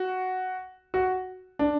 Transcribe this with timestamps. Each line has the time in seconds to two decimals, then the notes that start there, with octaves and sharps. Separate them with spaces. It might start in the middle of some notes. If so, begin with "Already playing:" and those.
Already playing: F#4
0.94 F#4
1.59 D4